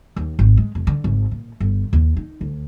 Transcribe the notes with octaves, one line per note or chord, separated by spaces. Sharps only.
D#2
G#1
G#3
F1
D3
G#1
A#2
G1
D#2
D#4
D2